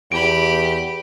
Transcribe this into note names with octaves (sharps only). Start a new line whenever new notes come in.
E2 G4 B5 D7